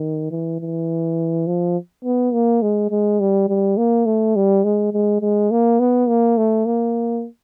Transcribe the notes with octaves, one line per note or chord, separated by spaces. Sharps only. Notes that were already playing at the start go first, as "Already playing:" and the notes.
Already playing: D#3
E3
E3
F3
B3
A#3
G#3
G#3
G3
G3
A#3
A3
G3
G#3
G#3
G#3
A#3
B3
A#3
A3
A#3